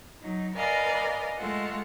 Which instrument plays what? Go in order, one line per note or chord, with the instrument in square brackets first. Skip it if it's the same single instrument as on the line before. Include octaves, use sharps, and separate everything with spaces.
[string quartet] F#3 D#4
A#4 B4 D5 D#5 F5 G#5
G#3 A3 F4 F#5